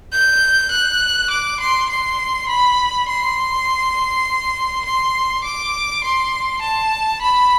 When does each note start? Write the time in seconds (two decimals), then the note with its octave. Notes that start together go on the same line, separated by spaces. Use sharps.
0.12 G6
0.71 F#6
1.30 D6
1.60 C6
1.90 C6
2.49 B5
3.08 C6
4.85 C6
5.44 D6
6.04 C6
6.62 A5
7.22 B5